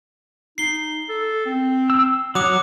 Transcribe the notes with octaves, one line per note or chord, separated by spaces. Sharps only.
D#4 C7 G7
A4
C4
E6
F#3 F#5 D6 D#6